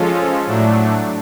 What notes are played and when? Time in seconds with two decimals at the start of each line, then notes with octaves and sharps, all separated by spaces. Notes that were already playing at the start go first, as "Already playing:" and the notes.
Already playing: F3 G#3 C#4 F4 A4
0.47 A2 F#3 A3 D4